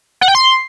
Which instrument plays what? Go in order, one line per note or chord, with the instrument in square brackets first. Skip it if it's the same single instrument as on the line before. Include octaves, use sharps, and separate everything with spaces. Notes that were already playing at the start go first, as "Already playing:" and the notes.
[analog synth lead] F#5
G5
C6